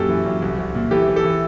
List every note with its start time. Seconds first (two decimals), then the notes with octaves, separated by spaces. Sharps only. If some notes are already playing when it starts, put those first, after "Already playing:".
Already playing: F#2 A#2 G4 A4
0.09 E3
0.26 F#2
0.42 C2
0.59 C2
0.75 A#2
0.91 E3 G4 A4
1.08 E3
1.16 G4 A4
1.25 E3